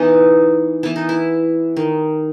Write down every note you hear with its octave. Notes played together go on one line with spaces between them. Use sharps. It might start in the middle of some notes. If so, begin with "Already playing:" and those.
Already playing: E3 B3 D#4
E3 B3 E4
D#4
E4
D#3